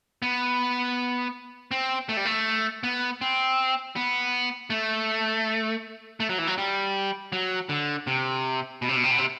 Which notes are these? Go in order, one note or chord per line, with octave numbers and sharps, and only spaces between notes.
B3
C4
A3
G3
A3
B3
C4
B3
A3
A3
F#3
E3
F#3
G3
F#3
D3
C3
B2
C3
B2
C3
B2
C3